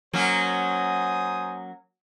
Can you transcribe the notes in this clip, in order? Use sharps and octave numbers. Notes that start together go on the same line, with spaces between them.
F#3 A#3 C#4 C5 G#5 D#6